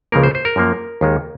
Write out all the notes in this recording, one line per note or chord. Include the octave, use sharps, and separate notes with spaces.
C#2 C#3 F3 A#3 A#4
C5
C5
A#4
F#2 F3 A#3
D#2 D#3 G#3